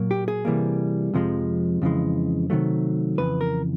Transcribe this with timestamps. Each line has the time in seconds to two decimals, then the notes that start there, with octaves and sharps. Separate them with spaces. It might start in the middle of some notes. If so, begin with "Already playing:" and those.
Already playing: A#2 F#3 A#3
0.11 G4
0.28 G#4
0.45 C3 E3 G3 A#3
1.14 F2 C3 F3 G#3
1.82 F2 C#3 E3 G#3
2.50 C3 D#3 F#3 A3
3.18 F2 C#3 E3 B4
3.41 A#4